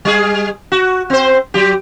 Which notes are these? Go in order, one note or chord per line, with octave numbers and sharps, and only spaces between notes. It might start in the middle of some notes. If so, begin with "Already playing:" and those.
G3 G#4
F#4
C4 C5
F#3 G4